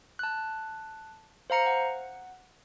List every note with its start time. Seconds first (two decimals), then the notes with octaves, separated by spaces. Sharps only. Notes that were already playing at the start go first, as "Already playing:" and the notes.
0.19 A5 F#6
1.50 C5 F5 A#5 C#7
1.66 F#5